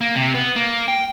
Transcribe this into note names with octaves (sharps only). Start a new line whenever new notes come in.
A#3
C3
B3
A#3
G5